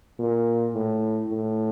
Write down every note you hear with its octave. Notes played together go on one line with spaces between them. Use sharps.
A#2
A2
A2